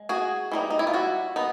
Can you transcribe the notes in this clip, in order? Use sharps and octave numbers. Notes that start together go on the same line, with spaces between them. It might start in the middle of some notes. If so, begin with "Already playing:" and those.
Already playing: G#3
F#4 G#4
E3 G3 C4 D#4
D#4
E4
F4
E4 F#4
B3 D#4